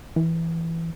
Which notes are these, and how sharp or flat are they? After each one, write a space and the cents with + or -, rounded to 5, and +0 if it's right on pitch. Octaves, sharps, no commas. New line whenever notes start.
E3 +5